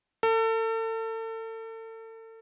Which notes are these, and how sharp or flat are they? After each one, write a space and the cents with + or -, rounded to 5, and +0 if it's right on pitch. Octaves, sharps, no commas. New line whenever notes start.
A4 +35